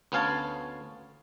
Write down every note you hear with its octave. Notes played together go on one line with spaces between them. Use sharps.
D2 B3 C#4 F5 G#5 A5